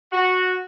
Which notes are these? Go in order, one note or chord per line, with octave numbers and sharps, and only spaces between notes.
F#4